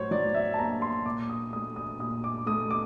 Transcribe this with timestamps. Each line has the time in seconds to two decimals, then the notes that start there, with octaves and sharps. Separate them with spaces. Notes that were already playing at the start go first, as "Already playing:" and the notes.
Already playing: A2 F#3 C5 C#5
0.11 F#3 D5
0.35 E5
0.54 A5
0.59 A#3 A#5
0.82 C6
1.06 A#2 D6
1.29 D#6
1.52 A3 D#6
1.76 D#6
1.99 A#2 D#6
2.24 D6
2.46 A3 D#6
2.70 D6